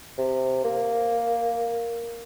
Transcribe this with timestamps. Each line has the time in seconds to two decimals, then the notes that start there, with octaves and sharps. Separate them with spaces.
0.18 C3
0.64 A#3